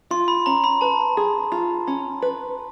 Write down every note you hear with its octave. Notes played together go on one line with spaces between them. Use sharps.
F4 C6
B5
C#4 A#5
B5
B4 A5
G#4
F4
C#4
B4